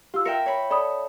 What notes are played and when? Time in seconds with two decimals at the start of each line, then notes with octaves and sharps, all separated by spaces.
0.14 F4 G4 E6
0.25 A#4 E5 G5 C#7
0.46 C#5 B5
0.70 A4 D5 B5 D#6